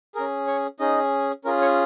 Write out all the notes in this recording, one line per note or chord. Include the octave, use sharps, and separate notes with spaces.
C#4 G#4 A#4
C#5
C#4 D#4 G#4 D#5
C#4 F4 G#4 A#4
C#5